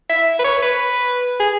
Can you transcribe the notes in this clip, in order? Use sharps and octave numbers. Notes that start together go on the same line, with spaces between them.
E5
B4
C#5
B4
G#4